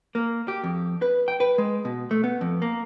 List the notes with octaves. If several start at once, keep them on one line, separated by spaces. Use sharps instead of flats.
A#3
G4
F2
B4
G5
B4
G#3
B2
A3
B3
F2
A#3